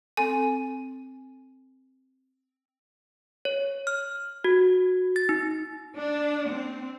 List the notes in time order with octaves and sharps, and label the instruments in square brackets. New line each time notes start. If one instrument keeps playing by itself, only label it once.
[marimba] C4 A4 [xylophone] G#5
[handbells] C#5
F6
F#4
A6
D#4
[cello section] D4
C4